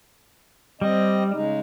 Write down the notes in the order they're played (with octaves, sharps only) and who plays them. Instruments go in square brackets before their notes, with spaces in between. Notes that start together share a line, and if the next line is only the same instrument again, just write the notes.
[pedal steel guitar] G3 [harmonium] C4 D#5
[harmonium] C#3 G#3 D#4